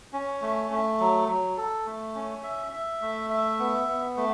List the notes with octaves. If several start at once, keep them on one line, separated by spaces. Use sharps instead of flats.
C#4
A3
A3
F#3
F#3
A4
A3
C#4
E5
E5
A3
E5
B3
B3
A3